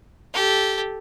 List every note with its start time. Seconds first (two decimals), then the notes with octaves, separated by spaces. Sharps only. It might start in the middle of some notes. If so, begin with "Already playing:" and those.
0.34 G4 A4